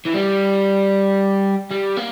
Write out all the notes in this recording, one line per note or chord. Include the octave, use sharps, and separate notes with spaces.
E3
G3
G3
A#3